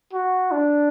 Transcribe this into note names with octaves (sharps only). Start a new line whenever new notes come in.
F#4
D4